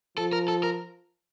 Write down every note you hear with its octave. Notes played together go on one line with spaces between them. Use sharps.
F3 A4
A#4
A4
A#4